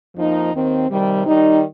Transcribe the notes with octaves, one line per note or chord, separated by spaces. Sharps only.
F2 F3 A#3 D#4
D#2 D#3 C4
C3 D#3 G3
D#3 G3 D#4